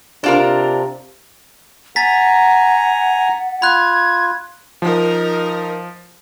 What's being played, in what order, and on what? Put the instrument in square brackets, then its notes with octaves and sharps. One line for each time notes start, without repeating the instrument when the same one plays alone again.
[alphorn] C3 [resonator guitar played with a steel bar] D4 F4 A#4
[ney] F#5 [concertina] G#5 A#5 [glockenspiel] A6 B6
[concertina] F4 [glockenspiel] B5 F#6 [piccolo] G#6
[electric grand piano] F3 [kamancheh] D#4 A#4